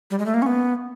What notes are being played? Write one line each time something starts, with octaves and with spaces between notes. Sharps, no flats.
G3
G#3
A3
A#3
C#4
B3